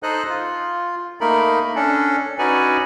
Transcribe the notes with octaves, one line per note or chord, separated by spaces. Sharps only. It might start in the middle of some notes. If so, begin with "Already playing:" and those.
D#4 A4 C5 D#5 F#6
F4
A3 A#3 D#4 A#4 B5
C#4 D4 A4
C#4 D#4 F#4 B4 D5 G#5